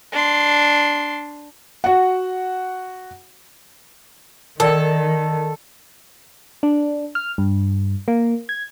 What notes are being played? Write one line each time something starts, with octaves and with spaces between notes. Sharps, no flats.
D4 C6
F#4 F#5
D#3 A4 A#4 D5 G5
D4
F6
G2
A#3
G#6